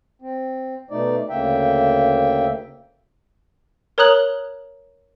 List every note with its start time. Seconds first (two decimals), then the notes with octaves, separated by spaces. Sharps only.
0.22 C4
0.90 B2 A3 D#4 D5
1.29 D2 C#3 A#3 E5 G5
3.98 A#4 C#5 A#5 D#6 F#6 F#7